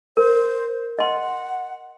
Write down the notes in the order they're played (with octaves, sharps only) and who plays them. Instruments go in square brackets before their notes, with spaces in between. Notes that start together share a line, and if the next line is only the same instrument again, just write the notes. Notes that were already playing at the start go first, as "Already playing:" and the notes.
[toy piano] A#4 [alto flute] C5
[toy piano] D#5 C6 [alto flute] F#5